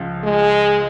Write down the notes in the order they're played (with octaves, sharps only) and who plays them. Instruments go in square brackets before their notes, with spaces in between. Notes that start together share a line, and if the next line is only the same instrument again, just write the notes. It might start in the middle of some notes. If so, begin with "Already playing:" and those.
Already playing: [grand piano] C#2 C#3 F3
[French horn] G#3